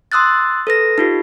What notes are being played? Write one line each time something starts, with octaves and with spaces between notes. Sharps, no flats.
C6 D#6 E6 F#6 A6
A4 B4 A#6
D#4 F4 G4